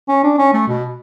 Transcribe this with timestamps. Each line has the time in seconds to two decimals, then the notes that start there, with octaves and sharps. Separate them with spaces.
0.09 C#4
0.24 D4
0.38 C#4
0.53 A3
0.68 B2